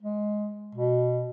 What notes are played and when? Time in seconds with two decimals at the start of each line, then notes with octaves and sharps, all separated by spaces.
0.02 G#3
0.75 B2